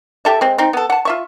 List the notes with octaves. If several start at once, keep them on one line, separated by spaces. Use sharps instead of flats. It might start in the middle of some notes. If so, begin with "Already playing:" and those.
G4 A4 E5
G#3 C4
C4 D#4
B3 A4
F#5 A5
F4 E5 C#6